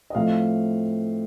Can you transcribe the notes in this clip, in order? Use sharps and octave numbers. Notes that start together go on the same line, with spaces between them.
D#5
A2 F3 C4 F5